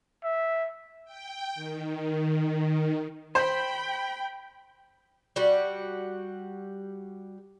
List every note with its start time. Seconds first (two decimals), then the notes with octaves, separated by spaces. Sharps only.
0.24 E5
1.05 G5
1.55 D#3
3.35 C5 G5 B5
5.36 G3 F#4